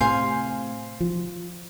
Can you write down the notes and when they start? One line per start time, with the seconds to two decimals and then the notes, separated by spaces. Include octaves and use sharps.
0.01 A2 C3 C5 F5 G#5
1.00 F3